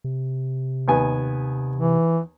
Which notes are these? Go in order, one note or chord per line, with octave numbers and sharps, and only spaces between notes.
C3
D#2 B3 G#5
E3